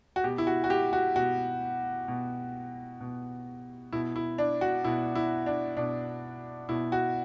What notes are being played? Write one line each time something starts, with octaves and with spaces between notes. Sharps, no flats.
F#4
B2 G4
E4
F#4
F#4
G4
F#4
B2 F#4
B2
B2
B2 E4
E4
D4
F#4
B2 E4
E4
D4
B2 D4
B2 E4
F#4